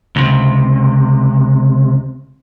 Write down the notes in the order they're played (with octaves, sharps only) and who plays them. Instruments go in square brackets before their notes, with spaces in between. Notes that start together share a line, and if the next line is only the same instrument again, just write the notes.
[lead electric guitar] C#2 C3